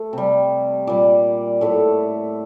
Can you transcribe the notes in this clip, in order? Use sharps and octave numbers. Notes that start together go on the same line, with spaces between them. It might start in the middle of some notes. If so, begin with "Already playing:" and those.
Already playing: A3
C3 G3
A#2 G3 D5
A2 A3